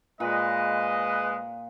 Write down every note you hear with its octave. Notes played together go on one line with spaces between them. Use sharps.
A#2 G#3 B4 D#5